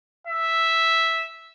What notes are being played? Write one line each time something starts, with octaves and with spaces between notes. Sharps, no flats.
E5